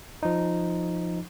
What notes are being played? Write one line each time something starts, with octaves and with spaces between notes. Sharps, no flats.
F3 D#4